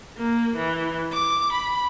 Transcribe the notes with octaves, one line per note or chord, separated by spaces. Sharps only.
A#3
E3
D6
B5